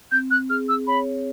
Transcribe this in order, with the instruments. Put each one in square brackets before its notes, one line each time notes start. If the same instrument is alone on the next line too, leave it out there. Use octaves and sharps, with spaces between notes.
[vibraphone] C4 [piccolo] G6
[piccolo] F#6
[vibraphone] G#4 [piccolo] F6
[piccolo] E6
[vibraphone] C#5 [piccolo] B5